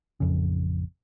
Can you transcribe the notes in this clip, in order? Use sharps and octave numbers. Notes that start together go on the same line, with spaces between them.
A1 F2 C#3